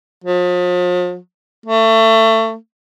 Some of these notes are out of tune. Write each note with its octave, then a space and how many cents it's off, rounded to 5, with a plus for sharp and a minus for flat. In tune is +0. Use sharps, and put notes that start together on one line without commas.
F3 +40
A3 +25